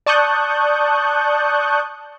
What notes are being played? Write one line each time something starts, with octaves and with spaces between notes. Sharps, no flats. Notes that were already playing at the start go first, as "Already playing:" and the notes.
D5 A5 C#6 D#6 F#6 G6